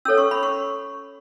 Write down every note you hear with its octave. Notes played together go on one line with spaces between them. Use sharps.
C#4 A4 C#5 E6
C#6
B5
C#6